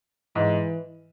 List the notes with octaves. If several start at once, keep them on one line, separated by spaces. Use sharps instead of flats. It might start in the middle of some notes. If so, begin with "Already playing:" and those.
G#2 E3